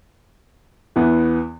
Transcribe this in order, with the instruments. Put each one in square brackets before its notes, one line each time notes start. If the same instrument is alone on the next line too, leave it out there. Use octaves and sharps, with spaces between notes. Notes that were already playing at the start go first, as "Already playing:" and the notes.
[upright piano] E2 E3 B3